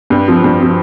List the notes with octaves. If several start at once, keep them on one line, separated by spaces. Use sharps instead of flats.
G2
F3 C4
G2
F3 C4